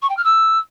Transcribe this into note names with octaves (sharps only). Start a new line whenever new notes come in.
C#6
G5
F6
E6